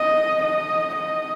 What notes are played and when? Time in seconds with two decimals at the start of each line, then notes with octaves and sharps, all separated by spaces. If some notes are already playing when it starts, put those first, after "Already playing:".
Already playing: D#5
0.42 D#5
0.96 D#5